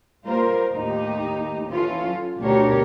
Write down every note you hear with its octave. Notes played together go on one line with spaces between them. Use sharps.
G3 A#3 F4 A#4 C5
D#2 A2 D#4 G4
E3 C#4 F4 A4
F#3
D2 B2 D4 G4 A#4 C#5